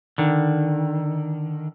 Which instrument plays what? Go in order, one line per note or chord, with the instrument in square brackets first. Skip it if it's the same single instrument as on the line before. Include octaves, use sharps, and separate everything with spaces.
[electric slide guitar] D3 D#3